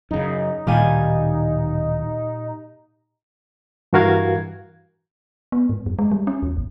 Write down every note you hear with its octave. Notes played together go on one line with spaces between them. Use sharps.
F#2 C#3 D#4
D1 A#2 D#3 G3 G4 F5 G#5
G2 E3 F#4 A#4 F5 G#6
B3
G#2
F#2
G#3
G3
C#4
E2
A1